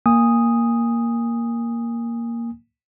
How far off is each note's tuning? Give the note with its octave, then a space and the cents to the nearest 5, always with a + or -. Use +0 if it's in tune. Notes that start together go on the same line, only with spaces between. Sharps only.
A#3 +0 G#5 -25 D#6 +0